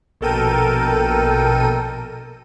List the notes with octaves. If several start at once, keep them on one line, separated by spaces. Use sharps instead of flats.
A#1 B2 A4 A#4 G5 D#7